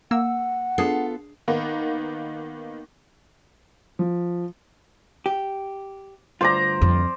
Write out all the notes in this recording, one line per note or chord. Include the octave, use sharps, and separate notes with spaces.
A#3 F#5 E6
B3 D4 F4 G#4 A4 C7
D#3 A#3 B3 D#4
F3
G4
D2 G2 F4 C5 D5 A#5
F2